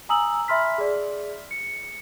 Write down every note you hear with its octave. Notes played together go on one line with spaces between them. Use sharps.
G#5 A#5 D#6 E6 F#7
E5 B5 C6 F6 B6
G#4 D5
C#7